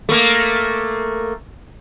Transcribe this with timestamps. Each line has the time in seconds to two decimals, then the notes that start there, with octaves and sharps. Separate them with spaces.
0.09 A3 A#3